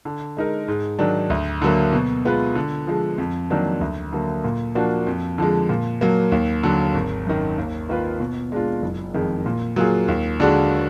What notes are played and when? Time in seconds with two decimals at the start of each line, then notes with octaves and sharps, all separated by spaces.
0.05 D3
0.37 G#3 D#4 A#4
0.68 G#2
0.99 D#3 F#3 D4
1.30 D2
1.62 D3 F#3 A#3
1.93 B2
2.25 G#3 B3 F4 B4
2.55 D3
2.87 F3 G#3
3.18 F2
3.50 D#3 F#3 A#3 D4
3.81 D2
4.13 D3 F#3 A#3
4.44 A#2
4.75 F3 A#3 D4 F#4
5.07 F2
5.38 D3 F3 G#3
5.69 A#2
6.01 F#3 A#3
6.32 D#2
6.63 D3 F#3
6.94 G#1
7.26 F#2 D#3
7.58 D#2
7.89 D#3 A#3 F4 B4
8.20 B2
8.52 G#3 D4 F4
8.82 F#1
9.14 F2 D#3 G#3
9.46 A#2
9.76 F#3 A#3 F4 G#4
10.08 D#2
10.40 D3 G#3 D4 F#4